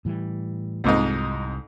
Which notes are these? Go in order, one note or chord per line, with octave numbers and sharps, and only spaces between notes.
A2 E3 G3
C2 F2 G#2 D#4